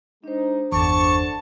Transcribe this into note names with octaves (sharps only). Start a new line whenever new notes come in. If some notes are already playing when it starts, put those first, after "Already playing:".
G#3 D4 D#4 C5
G1 E2 D3 A5 C#6 D6